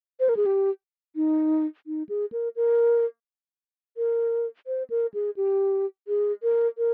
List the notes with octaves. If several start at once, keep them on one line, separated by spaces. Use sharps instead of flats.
C5
A#4
G#4
G4
D#4
D#4
G#4
A#4
A#4
A#4
C5
A#4
G#4
G4
G#4
A#4
A#4